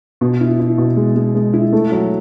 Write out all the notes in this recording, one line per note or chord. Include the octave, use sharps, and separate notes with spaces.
B2
E4
E4
B2
G#3
G#3
G#3
E4
A3
F#3